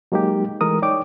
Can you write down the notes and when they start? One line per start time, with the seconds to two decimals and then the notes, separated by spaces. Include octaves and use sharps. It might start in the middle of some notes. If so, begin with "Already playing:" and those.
0.12 F#3 G#3 A#3 D#4 G4
0.61 E3 G#3 A3 A#4 D#6
0.82 D#4 C#5 D5 G5 D6